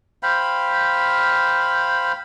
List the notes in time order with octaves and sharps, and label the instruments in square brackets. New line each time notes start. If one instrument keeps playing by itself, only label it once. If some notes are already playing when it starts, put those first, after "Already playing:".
[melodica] C5 F5 G5 B5